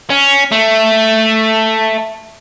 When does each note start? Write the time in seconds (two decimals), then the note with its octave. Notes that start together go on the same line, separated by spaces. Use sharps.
0.10 C#4
0.52 A3